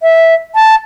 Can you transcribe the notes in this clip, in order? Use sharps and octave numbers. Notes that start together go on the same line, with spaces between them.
E5
A5